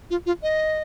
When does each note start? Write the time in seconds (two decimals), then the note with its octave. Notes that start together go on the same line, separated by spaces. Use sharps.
0.10 F4
0.26 F4
0.43 D#5